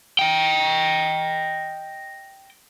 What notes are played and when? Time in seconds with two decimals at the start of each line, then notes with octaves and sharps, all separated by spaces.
0.19 D#5 G5